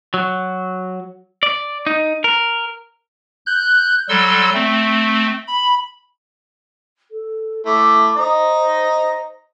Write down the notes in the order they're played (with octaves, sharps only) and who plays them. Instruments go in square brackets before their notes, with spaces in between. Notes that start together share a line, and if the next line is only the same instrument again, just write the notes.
[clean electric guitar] F#3
D5
D#4
A#4
[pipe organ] F#6 G6
F#3 G3 A4 C6 E6
A3 C4
B5
[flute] A4
[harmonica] A3 E4 [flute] D6
[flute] C5 [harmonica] D#5 A#5